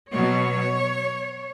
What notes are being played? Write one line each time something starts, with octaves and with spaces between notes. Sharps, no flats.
B2 F#3 B3 C#5